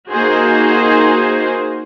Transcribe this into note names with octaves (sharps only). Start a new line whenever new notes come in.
A#3 D#4 F#4 G#4 C5